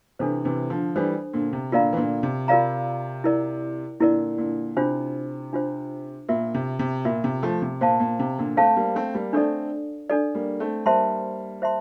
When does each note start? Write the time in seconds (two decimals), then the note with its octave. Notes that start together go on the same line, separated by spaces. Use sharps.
0.19 C3 E3 D4 A4 C5
0.45 C3 E3
0.70 D3 F3
0.96 E3 G3 D4 A4 C5
1.34 A#2 D3
1.53 C3
1.72 A#2 D3 F4 A#4 D5 F5 A#5
1.93 E3
1.97 A#2 D3
2.23 C3
2.48 F4 A#4 D5 F5 A#5
3.24 E4 A#4 D5
4.00 A#2 D3 E4 A#4 D5
4.38 A#2 D3
4.77 C3 D4 F4 C5
5.53 D4 F4 C5
6.29 A#2 F4 A#4 E5
6.54 C3
6.79 C3
7.05 A#2 F4 A#4 E5
7.24 C3
7.43 F3 A3
7.62 C3
7.81 A#2 C5 F5 A5
8.00 A#2
8.19 C3
8.38 A#2 D3
8.57 A3 C4 C5 F5 A5
8.76 G3 A#3
8.95 A3 C4
9.14 G3 A#3
9.33 A3 C4 D4 A4 D5
10.10 D4 A4 D5
10.35 G3 A#3
10.60 A3 C4
10.86 G3 A#3 C5 E5 A5 C6
11.62 C5 E5 A5 C6